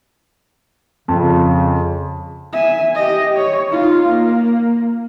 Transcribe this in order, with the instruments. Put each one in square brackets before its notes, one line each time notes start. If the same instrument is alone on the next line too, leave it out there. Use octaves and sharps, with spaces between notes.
[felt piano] F2 [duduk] C#3
[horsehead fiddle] E5 G#5
G4 D#5
C#5
D#4 F4
A#3